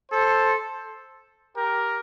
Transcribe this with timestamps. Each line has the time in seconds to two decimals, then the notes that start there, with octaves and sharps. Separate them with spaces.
0.11 A4 C5
1.56 G4 A#4